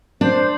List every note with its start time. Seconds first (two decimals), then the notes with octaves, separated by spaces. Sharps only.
0.21 D4 C5